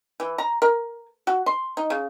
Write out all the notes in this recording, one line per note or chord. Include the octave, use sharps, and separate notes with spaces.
E3
A#5
A#4
F#4
C6
D#4
C#3